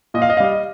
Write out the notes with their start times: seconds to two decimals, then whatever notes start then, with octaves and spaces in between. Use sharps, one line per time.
0.14 A#2 D#5
0.22 F5
0.30 D#5
0.37 F5
0.40 G3 D#5